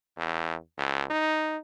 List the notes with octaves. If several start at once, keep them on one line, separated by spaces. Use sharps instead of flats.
E2
C#2
D#4